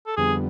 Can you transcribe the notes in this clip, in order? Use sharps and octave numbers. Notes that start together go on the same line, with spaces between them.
A4
F2 D3 G3 B3 G#4